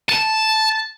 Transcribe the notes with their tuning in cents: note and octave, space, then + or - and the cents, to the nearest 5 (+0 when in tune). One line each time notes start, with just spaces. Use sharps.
A5 -5